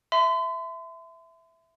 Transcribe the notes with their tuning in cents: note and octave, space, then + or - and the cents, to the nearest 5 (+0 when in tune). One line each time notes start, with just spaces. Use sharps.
E5 +0 C6 -40